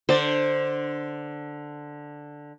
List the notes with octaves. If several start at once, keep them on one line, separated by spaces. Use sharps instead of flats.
D3 C5 D5